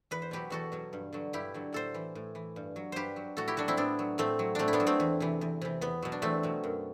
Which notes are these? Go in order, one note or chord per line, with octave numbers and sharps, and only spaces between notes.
E2 B4
C5
B2 F#3 G4 B4
E2 F#4 A4
B2 F#3
G2
D3 F#3
G2 E4 G4
D3 F#3
A2 A4 C5
E3
A2
E3
G2
F#3
G2 G4 B4 C5
F#3
A2 F#4 A4
E4 G4
F#3 D4 F#4
C4 E4
A2 B3 D4
F#3
A2 A3 C4
F#3
A2 A3 C4 D4
E4
B3 D4
F#3
A3 C4
E2
C3 E3
E2
C3 E3
E2 B3
B2 F#3
D4
E2 A3 C4
B2 F#3
F#2